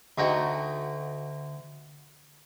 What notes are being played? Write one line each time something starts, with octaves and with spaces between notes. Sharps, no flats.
D2 D#4 F#4 G5